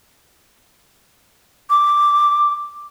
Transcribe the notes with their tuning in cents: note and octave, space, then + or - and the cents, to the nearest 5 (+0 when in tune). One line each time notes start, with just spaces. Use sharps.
D6 +0